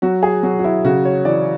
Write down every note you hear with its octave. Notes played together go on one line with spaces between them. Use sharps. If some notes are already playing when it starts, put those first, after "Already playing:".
F#3 F#4
G#4
F#3 F#4
F#4
E4
C#3 F#4
C#5
E3 D5